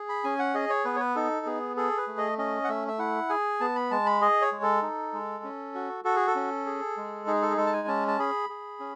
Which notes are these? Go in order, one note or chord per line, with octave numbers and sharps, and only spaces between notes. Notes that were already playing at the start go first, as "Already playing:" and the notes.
Already playing: G#4
B5
C#4 G#5
F#5
G#4 D#5
C#5
B3 B4
C#5
B4
D#4 A4
B3 G#4
G#4 A4
B4
A3
D#5
C#4 D#5
F#5
A3 E5
E5
E4 F#5
G#4 G#5
B3 A5
B5
G#3 A5
B5
G#4 D#5
C#5
G#3
A4
D#4
G#3
C#4
F#4
F#4 A4
G#4
A4
C#4
G#4
G#3
D#4 G#4
A4
G#4
G#3 A4
A5
G#5
C#4 A5
A5
G#4 B5
G#4
C#4